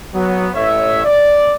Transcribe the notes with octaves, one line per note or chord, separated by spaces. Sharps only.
F#3 B3
A1 C#5 E5
D5